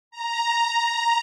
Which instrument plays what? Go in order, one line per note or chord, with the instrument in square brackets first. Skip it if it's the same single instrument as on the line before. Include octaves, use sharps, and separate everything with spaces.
[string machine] A#5